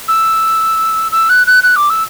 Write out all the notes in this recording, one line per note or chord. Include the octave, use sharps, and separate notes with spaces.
E6
E6
F#6
F#6
F#6
D6
E6